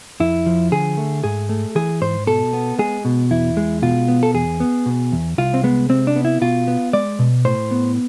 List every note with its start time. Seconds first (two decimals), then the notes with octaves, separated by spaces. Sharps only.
0.20 F2 E4
0.46 F3
0.72 D3 G#4
0.97 A3
1.24 G#2 G#4
1.49 A3
1.75 E3 G#4
2.01 G#2 C5
2.27 B2 A4
2.53 B3
2.79 G#3 G#4
3.05 B2
3.31 E2 E4
3.57 G#3
3.82 B2 F4
4.08 B3
4.23 A4
4.34 E2 G#4
4.60 B3
4.86 B2
5.12 E2
5.38 C2 F4
5.54 C4
5.63 G#3 B3
5.89 C3 C4
6.07 D4
6.16 B3
6.25 E4
6.41 B2 F4
6.68 B3
6.93 G#3 D5
7.19 B2
7.45 A2 C5
7.71 B3